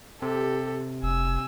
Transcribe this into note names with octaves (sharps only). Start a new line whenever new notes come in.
C3 G4 A4
F1 G#5 E6